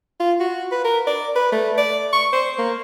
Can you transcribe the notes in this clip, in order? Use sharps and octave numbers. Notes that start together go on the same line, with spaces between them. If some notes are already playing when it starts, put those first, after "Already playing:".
F4
F#4
B4
A#4
D5
B4
A3
D5
C#6
C5
A#3